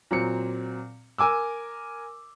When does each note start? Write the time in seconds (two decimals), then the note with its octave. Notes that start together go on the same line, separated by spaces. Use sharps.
0.11 A#2 F#3 C4 C#7
1.18 A#4 G#5 D6 E6